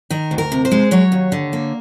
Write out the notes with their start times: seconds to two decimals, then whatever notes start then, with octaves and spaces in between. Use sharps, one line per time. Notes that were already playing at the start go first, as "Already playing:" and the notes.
0.10 D#3 A#4
0.31 D2
0.38 A#4
0.52 C3
0.65 C5
0.71 G#3
0.91 F#3 C#5
1.12 D#2
1.32 D3
1.53 A#3